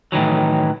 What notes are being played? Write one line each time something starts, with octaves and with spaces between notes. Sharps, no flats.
A2 D#3 E3 F#3